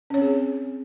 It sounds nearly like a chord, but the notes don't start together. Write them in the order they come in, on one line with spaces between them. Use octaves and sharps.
C#4 C#5 C4 G#4